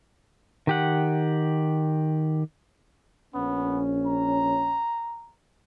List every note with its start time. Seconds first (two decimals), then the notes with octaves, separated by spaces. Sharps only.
0.67 D#3 G4 F#5
3.35 A#1 B3 C#4
4.07 A#5